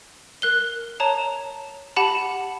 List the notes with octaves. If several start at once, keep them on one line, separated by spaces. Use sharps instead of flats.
A#4 F#6 G7
C#5 A5 A#5
G4 F#5 A5 B5